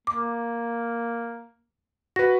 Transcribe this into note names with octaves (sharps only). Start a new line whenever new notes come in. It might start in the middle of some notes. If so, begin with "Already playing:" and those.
A#3 D6
F#4 B4 A#6